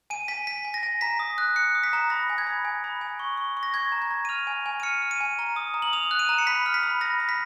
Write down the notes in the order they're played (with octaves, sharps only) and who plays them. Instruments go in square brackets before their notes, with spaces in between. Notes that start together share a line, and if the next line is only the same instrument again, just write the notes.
[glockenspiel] G#5 D#7
G#5 B6
G#5 B6
G#5
A#6
G#5
A#5 B6
D#6
F#6
F#6 C#7
D#6
B6
A#5
B5 A#6
G#5
G#6
B5
G#5
B5
G#5
C#6
C#6
C#6
A#6
C#6 G#6
A#5
G#6
A#5
D#7
F6 F7
G#5
G#5
D#7
F6 C#7
F6
D#7
G#5
A#5
D#6
A#5
F#7
D#6 F7
F#6
D#7
A#5
C#7
B5 B6
F6
B6
B5
B5 A#6
B5
B6